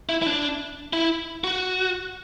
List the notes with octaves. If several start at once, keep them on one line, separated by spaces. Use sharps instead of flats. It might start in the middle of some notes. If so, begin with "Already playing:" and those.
E4
E4
D4
E4
F#4